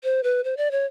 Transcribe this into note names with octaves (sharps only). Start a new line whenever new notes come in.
C5
B4
C5
D5
C#5